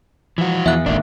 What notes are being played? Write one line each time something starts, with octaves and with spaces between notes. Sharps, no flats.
E3 F3 F#4
E2 E5 F5 F#6
D#1 G#1 D3 A#3 D4